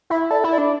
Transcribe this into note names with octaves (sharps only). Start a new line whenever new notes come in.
E4 E5
A4 D5
E4
D5
D4